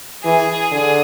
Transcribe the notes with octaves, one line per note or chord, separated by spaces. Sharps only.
E3 G#4
D3 G#4